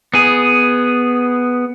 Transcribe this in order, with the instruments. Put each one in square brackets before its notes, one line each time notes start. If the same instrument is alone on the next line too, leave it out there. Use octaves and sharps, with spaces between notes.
[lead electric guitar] B3 G#4